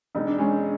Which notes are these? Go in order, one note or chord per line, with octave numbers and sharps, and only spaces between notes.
E1 D#4
D4
G#3 C#4